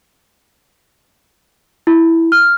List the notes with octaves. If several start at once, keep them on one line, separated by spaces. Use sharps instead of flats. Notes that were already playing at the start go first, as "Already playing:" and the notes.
E4
F6